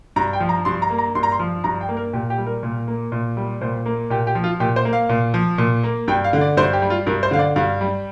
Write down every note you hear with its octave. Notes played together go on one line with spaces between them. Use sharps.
G2 A#5
G5
F3
A#5
G2 C6
A#5
A#3
A#5
G2 C6
A#5
C6
F3
G2 A#5
G5
A#3
A#4
A#2 G4
G4
G3
A#4
A#2
A#3
A#2
G3
A#2 C5
A#3
A#2 G4
G4
F3
F4
A#2 G4
C5
A#3
F5
A#2
F3
A#2
A#3
G2 G5
F5
D3
D5
G2 C5
G4
G3
F4
G2 A#4
C5
D3 F5
D5
G2 F5
G3